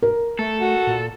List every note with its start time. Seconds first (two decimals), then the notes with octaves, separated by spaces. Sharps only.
0.02 A#4
0.39 A3 A4
0.61 F#4
0.87 A#2